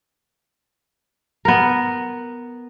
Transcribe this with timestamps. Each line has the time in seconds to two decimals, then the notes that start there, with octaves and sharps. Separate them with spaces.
1.45 B3 A#4